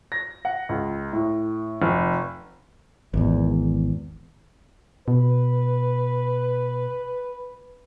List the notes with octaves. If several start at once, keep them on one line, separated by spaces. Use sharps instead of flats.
A#6
F#5
C#2
A2
F1
G#1 E2
B2 B4